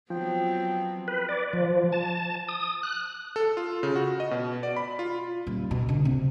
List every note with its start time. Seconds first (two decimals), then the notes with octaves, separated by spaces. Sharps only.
0.10 F3 F#3 B3 C4 G5
1.08 B4
1.29 D5
1.53 F3
1.92 A5
2.48 D#6
2.83 F#6
3.36 A4
3.57 F4
3.83 C#3
3.96 F#4
4.20 D#5
4.31 B2
4.63 D5
4.76 B5
4.99 F4
5.47 D#1
5.71 B2
5.89 D3
6.05 C3